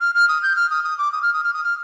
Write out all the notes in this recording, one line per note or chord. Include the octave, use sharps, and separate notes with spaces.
F6
F6
D#6
G6
F6
D#6
D#6
D6
D#6
F6
D#6
F6
D#6
F6